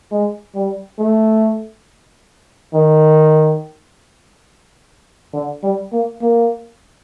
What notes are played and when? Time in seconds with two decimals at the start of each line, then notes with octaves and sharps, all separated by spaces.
0.12 G#3
0.55 G3
0.99 A3
2.73 D#3
5.33 D3
5.63 G3
5.92 A#3
6.21 A#3